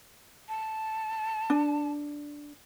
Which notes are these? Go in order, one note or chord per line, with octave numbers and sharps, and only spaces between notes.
A5
D4